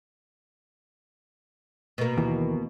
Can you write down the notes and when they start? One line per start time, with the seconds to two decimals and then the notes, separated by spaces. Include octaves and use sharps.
1.98 B2 A#3
2.17 D#2 E3